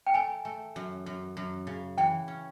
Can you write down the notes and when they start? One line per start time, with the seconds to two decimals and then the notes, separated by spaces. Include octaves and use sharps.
0.07 G5
0.14 A3 G#5
0.45 A3
0.76 F#2
1.06 F#2
1.37 F#2
1.67 C#3
1.98 E3 G5
2.28 C#4